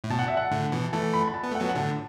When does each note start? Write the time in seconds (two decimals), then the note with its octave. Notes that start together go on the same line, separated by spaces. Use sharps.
0.04 A2
0.10 B2 A5
0.19 F#5
0.28 E5
0.37 F#5
0.51 A2 D3
0.72 B2 E3
0.93 E3 A3 A5
1.13 B5
1.28 B5
1.34 A5
1.43 B3
1.51 A3 F#5
1.60 F#3 B3
1.69 F#5
1.75 A2 D3 A5